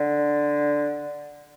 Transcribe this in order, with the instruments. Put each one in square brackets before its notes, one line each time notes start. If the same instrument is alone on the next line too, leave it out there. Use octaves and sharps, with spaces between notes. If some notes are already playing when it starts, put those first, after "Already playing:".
Already playing: [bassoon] D3